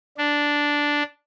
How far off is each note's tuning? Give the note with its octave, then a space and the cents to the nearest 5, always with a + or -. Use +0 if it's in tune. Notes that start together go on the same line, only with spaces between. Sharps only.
D4 -5